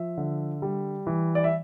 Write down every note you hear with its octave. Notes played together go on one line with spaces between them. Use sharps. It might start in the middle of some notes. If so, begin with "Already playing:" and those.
Already playing: F3 E5
D3
G3
E3
D5
E5